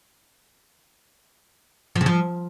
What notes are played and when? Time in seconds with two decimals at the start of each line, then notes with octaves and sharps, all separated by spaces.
1.96 F3
2.01 C#3
2.06 F3